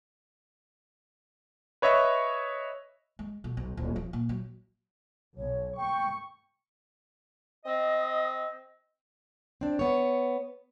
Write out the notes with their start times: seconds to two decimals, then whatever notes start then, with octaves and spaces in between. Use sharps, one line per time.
1.82 B4 C#5 D#5 E5 C#6
3.19 G#3
3.44 B2
3.57 B1
3.77 D1
3.96 F3
4.13 A#2
4.29 F#3
5.38 B1 C#5
5.77 G5 C#6
7.65 C4 D#5
9.61 C4 D4
9.79 B3 C#5